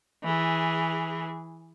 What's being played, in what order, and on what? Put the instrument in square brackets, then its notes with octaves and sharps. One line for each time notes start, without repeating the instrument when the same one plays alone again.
[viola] E3 G#4